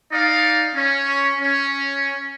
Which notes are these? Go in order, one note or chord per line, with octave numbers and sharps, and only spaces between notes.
D#4 D5 F5
C#4
C#4